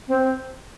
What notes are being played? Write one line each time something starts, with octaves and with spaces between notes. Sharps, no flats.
C4